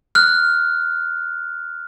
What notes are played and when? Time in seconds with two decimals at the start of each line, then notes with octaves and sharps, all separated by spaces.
0.15 F6 F#6